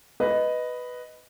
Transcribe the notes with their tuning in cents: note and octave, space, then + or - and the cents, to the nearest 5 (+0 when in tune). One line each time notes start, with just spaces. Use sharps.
B4 +5 D#5 +0